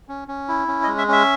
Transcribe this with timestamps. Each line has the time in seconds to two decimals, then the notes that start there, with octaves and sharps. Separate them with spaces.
0.08 C#4
0.28 C#4
0.48 E4
0.68 C#4
0.83 D#5
0.87 G#3
0.98 E5
1.08 C#4 E5